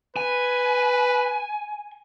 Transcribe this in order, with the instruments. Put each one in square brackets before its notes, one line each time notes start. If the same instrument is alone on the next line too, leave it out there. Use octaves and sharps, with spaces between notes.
[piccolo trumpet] B4 [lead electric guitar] G#5